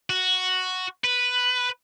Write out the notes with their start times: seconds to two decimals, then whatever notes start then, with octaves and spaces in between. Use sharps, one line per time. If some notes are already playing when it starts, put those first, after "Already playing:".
0.10 F#4
1.04 B4